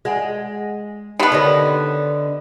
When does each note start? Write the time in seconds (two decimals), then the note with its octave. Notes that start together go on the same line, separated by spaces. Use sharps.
0.05 G#3 D5 F#5 G#5
1.19 D#3 B3 D#4 G4 B5
1.32 D3 C#5 D#5